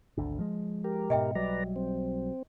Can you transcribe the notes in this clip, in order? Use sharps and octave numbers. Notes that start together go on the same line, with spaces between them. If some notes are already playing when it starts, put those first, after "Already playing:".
G#1 D2 D3
F3 G#3
G4 A#4
G#2 B2 D#5 E5 G5
B1 F#3 G3 B4 D5 A#5
C4